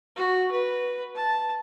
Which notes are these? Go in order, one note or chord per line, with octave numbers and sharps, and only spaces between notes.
F#4
B4
A5